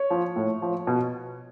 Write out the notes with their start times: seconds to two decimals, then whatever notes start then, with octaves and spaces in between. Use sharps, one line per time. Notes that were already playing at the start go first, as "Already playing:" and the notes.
Already playing: C#5
0.10 F3
0.36 A2
0.62 F3
0.87 B2